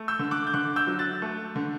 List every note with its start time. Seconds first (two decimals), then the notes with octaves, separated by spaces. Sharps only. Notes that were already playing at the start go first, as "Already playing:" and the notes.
Already playing: A3
0.08 E6 G6
0.19 D3
0.31 D6 F#6
0.47 G6
0.54 D3 D6 F#6
0.76 E6 G6
0.87 F#3
0.99 F#6 A6
1.22 A3
1.56 D3